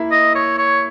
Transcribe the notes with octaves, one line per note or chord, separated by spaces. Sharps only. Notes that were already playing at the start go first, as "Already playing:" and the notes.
Already playing: A#3 E4
D#5
C#5
C#5